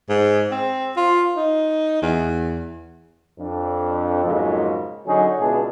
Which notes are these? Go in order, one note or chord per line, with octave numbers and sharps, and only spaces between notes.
G#2
C4
F4
D#4
E2
F2 D4
F2 G#2 C#3 F#3 G#3 A#3
D3 F#3 C#4 D#4 G#4
C#2 B2 D4 E4 G#4